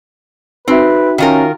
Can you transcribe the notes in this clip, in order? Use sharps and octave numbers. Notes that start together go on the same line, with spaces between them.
C4 D#4 F#4 B4 E5
D#3 C#4 F4 A#4